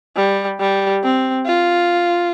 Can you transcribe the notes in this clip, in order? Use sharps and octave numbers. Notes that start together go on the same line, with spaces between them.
G3
G3
C4
F4